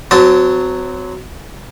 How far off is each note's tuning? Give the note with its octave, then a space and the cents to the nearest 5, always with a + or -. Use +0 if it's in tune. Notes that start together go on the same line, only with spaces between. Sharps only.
F#3 +0 C4 -35 A5 +0